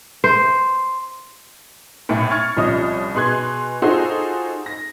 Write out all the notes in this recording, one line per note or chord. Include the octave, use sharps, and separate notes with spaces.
C5
B1 A2 C#7
C#6 F6 G#6 A6 C#7
C2 F3 C#4 D#5 D#6
B2 G#4 C6 F#6 G#6
D#4 F4 F#4 G#4 A4 C5
A#6